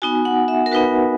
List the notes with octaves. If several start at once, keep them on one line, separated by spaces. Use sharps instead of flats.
B3 D#4 F#4 G#5
F#5
E5
A#4
B3 D#4 F#4 B4